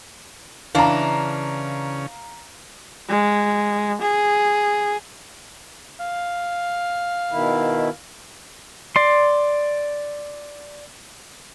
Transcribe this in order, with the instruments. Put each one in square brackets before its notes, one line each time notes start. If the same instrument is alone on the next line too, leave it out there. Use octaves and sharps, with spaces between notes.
[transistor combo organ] C#3 [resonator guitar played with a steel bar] E3 D4 [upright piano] F5 A#5
[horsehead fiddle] G#3
G#4
[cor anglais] F5
[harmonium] B2 D#3 E4
[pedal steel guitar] D5 C6